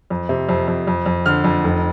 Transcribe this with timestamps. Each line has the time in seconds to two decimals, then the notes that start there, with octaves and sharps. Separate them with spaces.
0.10 F2
0.29 C3
0.49 F2
0.68 F2
0.87 F2
1.06 F2
1.26 D3 F6
1.44 F2
1.64 F1